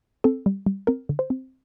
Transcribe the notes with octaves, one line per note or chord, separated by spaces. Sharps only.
C4 A4
G3
G3
C4 A#4
D3
C5
C4